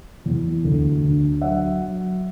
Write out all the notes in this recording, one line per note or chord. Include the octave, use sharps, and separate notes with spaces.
E2
D2
D3
F#3 E5 F#5
F#3